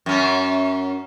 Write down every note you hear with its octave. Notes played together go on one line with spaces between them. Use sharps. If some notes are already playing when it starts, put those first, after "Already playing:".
F#2 C#4